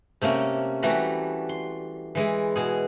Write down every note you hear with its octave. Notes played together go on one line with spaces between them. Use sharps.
C3 A3 A#3 C#4
E3 G3 A3 F#4 A#5 B5
C6
E3 G#3 E4
B2 G#4